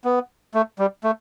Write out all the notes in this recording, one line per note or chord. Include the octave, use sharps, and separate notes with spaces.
B3
A3
G3
A3